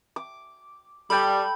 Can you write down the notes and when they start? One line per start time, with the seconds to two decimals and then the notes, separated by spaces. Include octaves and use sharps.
0.16 D6
1.10 G3 A4 G5 B5